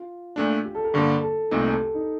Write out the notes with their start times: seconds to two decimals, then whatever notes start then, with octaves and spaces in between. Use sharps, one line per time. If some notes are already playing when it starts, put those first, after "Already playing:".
Already playing: F4
0.36 A#2 A3 D4
0.65 G4
0.75 A4
0.84 A#4
0.94 G2 D3 G3 A#3 A4
1.23 A4
1.51 C2 A#2 A3 C4 D#4
1.71 A4
1.80 G4
1.94 D#4